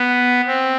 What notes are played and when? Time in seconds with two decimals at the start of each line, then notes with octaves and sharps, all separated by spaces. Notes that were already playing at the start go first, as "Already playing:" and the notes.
Already playing: B3
0.46 C4